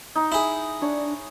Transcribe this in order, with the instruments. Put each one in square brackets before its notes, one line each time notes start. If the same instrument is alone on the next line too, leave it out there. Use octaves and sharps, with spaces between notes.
[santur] D#4
[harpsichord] E4 G#4
[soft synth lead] D4 [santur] C#5